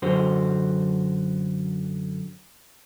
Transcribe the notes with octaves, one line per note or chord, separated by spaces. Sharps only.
F#2 D3 F#4 C5